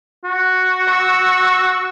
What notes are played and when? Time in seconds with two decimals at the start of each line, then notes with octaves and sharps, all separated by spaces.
0.24 F#4
0.87 C#6 E6